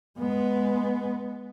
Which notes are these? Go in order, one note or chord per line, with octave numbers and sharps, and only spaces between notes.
G#3 B3